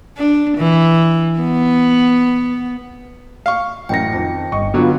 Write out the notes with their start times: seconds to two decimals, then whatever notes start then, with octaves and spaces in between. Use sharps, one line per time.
0.17 D4
0.57 E3
1.40 B3
3.46 F5 C#6
3.89 A1 F#2 G5 A#6 C#7
4.13 F2 D#3
4.52 G1 D#5 C#6
4.74 D3 F#3 B3 F4